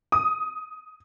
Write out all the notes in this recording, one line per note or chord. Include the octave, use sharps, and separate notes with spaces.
D#6